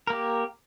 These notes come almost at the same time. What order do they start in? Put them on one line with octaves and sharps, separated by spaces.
A#4 A#3 G4